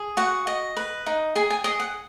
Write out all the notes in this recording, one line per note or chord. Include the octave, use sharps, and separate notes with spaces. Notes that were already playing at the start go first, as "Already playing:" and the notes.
Already playing: G#4
F#4 F#5
D#5
B4
D#4
G#4 G#5
G#5
G#4 D#5
F#5